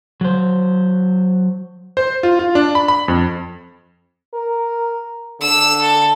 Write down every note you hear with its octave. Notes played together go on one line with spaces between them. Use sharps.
F#3 C5
C5
F4
F4
D4
B5
B5
F2
A#4
D3 E6
A4